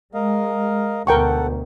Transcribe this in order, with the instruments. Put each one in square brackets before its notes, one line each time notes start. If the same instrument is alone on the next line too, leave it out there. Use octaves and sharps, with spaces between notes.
[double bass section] G#3 [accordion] A#4 D#5 F5
[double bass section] D2 B2 [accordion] A4 F#5 [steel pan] A#4 G5 C#6